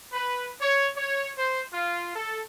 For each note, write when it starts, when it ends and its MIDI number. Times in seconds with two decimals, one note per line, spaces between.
0.13 0.51 71
0.61 0.90 73
0.97 1.28 73
1.38 1.63 72
1.73 2.12 65
2.16 2.41 69